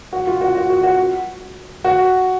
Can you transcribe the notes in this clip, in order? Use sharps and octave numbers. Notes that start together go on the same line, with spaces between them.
F#4
F4
F#4
F#4
F#4
F#4
F#4